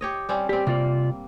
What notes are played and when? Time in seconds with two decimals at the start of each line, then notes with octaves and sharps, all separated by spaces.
0.01 G4 C#5 D#5
0.29 G3 C4 C#4
0.49 G3 C4 G4
0.67 C3 A#3 F4 D5